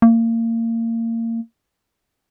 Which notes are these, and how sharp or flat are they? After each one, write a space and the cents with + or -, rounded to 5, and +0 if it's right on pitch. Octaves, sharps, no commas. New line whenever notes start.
A#3 -30